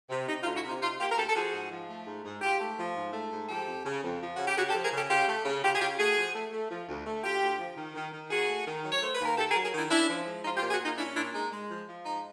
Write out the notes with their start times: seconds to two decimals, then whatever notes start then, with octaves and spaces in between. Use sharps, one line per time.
0.10 C3
0.28 C3 D#4
0.42 D#4 F4
0.46 D2
0.54 E4 F#4
0.64 C3
0.69 D#4 F4
0.82 C3 D#4 F4
0.99 A#3 F4 G4
1.12 A#4
1.17 D2 G4 A4
1.29 A4
1.35 F3 F#4 G#4
1.53 G#2
1.71 F3
1.89 A3
2.06 G#2
2.25 G#2
2.42 G#2 F4 G4
2.60 A3
2.78 F3
2.95 G#2
3.13 A3
3.31 G#2
3.49 F3 G4 A4
3.67 F2
3.85 C#3
4.03 F2
4.21 F3
4.36 C#3 F#4
4.46 G4
4.56 C#3 F#4 G#4
4.69 G4 A4
4.74 F3
4.83 G#4 A#4
4.92 C#3 G4 A4
5.10 C#3 F4 G4
5.28 A3
5.45 C#3
5.63 C#3 F4 G4
5.75 G#4
5.80 C#3 F4 G4
5.98 A3 F#4 G#4
6.16 F3
6.35 A3
6.52 A3
6.71 F3
6.88 D2
7.06 A3
7.23 D2 F4 G4
7.42 D2
7.59 F3
7.77 D#3
7.95 D#3
8.12 D#3
8.30 D#2 F#4 G#4
8.49 A3
8.67 D#3
8.84 F#3
8.92 C#5
9.01 A3 C5
9.14 B4
9.20 D#2
9.26 A#4
9.37 D#3 G4 A4
9.50 G#4 A#4
9.56 F#3
9.64 G#4 A#4
9.73 D#3
9.78 D4 E4
9.90 C#4 D4 E4
10.08 F3
10.26 G#3
10.44 F3 D#4 F4
10.57 F4 G4
10.62 A#2
10.71 F#4 G#4
10.80 A#2 D#4 F4
10.97 C#4 D4 E4
11.15 A#2 D4 E4
11.34 G#3 D#4
11.52 G#3
11.70 F3
11.87 F3
12.04 G#2 D#4